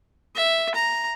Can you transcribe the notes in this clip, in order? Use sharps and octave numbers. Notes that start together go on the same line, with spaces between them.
E5
A#5